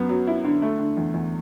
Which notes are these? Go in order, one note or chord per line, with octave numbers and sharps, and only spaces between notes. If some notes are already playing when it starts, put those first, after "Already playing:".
Already playing: F#2 B3
F#3
E4
D3
A3
D3
E2
E2